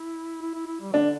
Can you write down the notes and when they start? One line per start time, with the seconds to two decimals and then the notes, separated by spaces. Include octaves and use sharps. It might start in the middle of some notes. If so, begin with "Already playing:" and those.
Already playing: E4
0.42 E4
0.55 E4
0.67 E4
0.81 G3
0.93 D3 D4